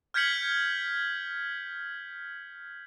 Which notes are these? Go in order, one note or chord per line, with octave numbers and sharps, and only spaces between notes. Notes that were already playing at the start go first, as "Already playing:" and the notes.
F6 G6 G#6 B6 C#7 F#7